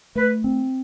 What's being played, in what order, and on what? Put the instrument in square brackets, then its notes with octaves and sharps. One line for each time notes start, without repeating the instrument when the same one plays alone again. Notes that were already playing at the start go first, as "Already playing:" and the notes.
[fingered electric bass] A3 [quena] B4
[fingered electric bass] C4